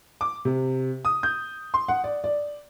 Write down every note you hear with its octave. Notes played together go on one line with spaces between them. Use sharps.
D6
C3
D#6
G6
C6
F#5
D5
D5